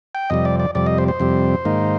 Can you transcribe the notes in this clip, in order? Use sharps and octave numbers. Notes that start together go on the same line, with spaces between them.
G5
F2 C3 G3 D#5
D5
D5
F2 C3 G3 D5
D#5
C5
C5
F2 C3 G3
G#2 D#3 A#3 D#4